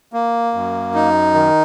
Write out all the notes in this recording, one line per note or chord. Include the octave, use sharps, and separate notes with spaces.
A#3
F#2
D#4
D#3